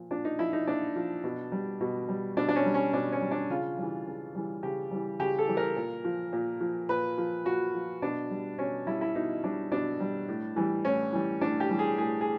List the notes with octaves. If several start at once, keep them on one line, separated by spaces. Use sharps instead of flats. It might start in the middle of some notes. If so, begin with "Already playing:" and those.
Already playing: A#2 F3
A#2 D4
D#4
F3 E4
D#4
A#2 D4
F3
B2
G3
B2
G3
B2 D4
D4
C#4
G3
C#4
B2 D4
C#4
G3
D4
C#3 F4
E3 G3
C#3
E3 G3
C#3 G4
E3 G3
C#3 G4
A4
E3 G3
A#4
A#2
F3
A#2
F3
A#2 B4
F3
A#2 F#4
F3
B2 D4
G3
B2 C#4
G3 E4
E4
B2 D#4
G3 D4
B2 D4
G3
A2
E3 G3
A2 C#4
E3 G3
A2 D4
G4
E3 G3
G#4
A2 G#4
G#4